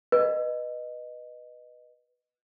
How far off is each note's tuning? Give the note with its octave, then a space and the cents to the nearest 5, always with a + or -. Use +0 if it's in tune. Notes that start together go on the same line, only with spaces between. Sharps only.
B4 -5 D#5 -15